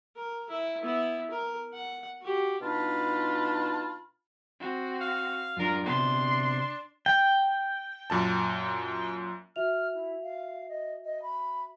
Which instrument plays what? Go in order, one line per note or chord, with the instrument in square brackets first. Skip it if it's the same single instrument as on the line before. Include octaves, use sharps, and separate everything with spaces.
[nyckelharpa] A#4
E4
B3 E4
A#4
F#5
F#4 G4
[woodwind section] B2 D4 D#4 F4 A5 B5
[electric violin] C4 F#4
[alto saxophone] F5
[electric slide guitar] F#2 D4 [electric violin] F4 A#4
[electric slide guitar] C3 B3 [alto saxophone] D4 [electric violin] C6
[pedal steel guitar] G5
[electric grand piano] F#2 A#2 A5
[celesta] F#4 E5 F7 [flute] F6
[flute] E4
F5
D#5
D#5
B5